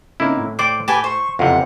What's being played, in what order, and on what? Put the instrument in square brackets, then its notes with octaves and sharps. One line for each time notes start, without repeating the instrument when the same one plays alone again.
[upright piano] C#3 C4 D#4 [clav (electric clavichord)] A#3 E4
[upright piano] A2
[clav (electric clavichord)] C5 D5 G5 [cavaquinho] D6
[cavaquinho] G4 B4 G#5 [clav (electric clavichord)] A5 [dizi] D6
[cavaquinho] C5 [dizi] C#6
[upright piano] F#1 E3 F5 [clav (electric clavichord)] F2 C3 [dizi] F#5